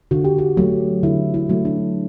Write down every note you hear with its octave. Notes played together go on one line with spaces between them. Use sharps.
D3 F#4
G4
F#4
F#3 A3
D3 E4
E4
F#3 A3
D4